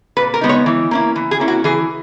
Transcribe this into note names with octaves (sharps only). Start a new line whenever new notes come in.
A#2 B4
A#4
G#3 B3 D#4
C#5
E3
A#3 C#4 E4
E3
G#4
A#3 C#4 E4
F#4
E3 G#4